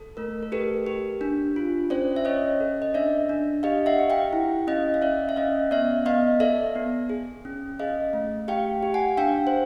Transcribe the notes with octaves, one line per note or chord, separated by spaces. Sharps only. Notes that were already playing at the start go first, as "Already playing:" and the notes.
Already playing: A4
A3 A#4
A#4
G4 A4 B4
G4
D4
F4
C#4 C5 D5
E5
C#4 C#5 D#5
A4
D#5
D4 D5 E5
D4
G4 D#5 F5
E5 F#5
G4
F5 G5
E4
C#4 D#5 F5
F5
C#4 D5 E5
E5
C#4 D#5 F5
B3 D5 E5
B3 D#5 F5
A4 D5 E5
B3
G#4
C#4
G#4 D#5 F5
A3
G4 F5 G5
G4
F#5 G#5
D4 F5 G5
C5